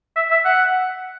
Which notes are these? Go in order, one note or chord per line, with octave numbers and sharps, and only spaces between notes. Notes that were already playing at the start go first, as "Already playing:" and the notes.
E5
E5
F#5